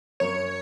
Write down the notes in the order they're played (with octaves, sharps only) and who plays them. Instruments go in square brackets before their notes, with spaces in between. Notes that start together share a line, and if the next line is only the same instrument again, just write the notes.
[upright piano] F#2 [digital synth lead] C#5